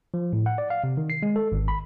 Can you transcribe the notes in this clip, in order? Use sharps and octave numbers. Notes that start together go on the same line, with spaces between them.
F3
A2
F#5
D5
F5
C3
D#3
C7
G#3
A4
G#1
B5